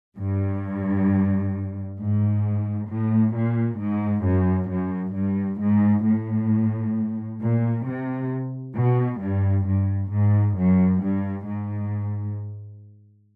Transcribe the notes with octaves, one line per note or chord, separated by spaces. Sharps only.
G2
G#2
A2
A#2
G#2
F#2
F#2
G2
G#2
A2
A#2
C3
B2
G2
G2
G#2
F#2
G2
G#2